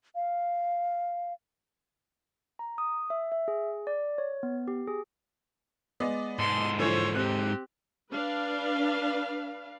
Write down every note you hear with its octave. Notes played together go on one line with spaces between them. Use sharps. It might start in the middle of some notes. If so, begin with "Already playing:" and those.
F5
A#5
D#6
E5
E5
G#4
D5
C#5
B3
G4
G#4
G#3 B3 D5
G#2 A4 C6
D3 E3 F3 C5 C#5
C4 G4 F#6
D4 B4 F5